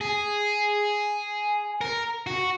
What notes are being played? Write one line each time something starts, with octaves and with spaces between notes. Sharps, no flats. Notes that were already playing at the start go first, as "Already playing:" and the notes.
G#4
A#4
F#4